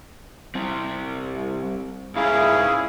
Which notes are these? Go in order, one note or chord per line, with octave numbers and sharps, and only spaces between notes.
G3 C4
G#2 C#4 E4 G#4 F5 A#5